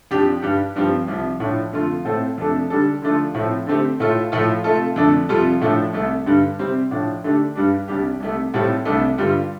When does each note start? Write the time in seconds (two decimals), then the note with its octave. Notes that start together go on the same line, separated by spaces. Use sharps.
0.11 F2 F3 D4 G4
0.42 G2 G3 D4 G4
0.76 G2 F3 C4 G4
1.07 C2 C3 F3
1.40 A2 F3 D4
1.73 F2 D3 A3 F4
2.05 A2 A3 C4 A4
2.38 F2 C3 A3 D4 A4
2.70 D3 G3 D4 A4
3.02 D3 F3 A3 D4 F4
3.34 A2 F3 A3 C4
3.66 D3 A3 C4 G4
4.00 A2 A3 F4 A4
4.32 A2 F3 A3 F4 A4
4.64 C3 A3 F4 A4
4.96 F2 D3 A3 D4
5.29 F2 C3 G3 F4 A4
5.61 A2 F3 A3 D4
5.93 C2 C3 A3
6.26 G2 D3 G3
6.59 C3 G3 C4
6.91 A2 F3 D4
7.24 D3 A3 D4 G4
7.55 G2 G3 D4
7.88 C2 C3 G3 D4 G4
8.20 C2 C3 A3
8.54 A2 G3 C4 A4
8.85 C2 C3 A3 D4
9.18 G2 D3 G3 F4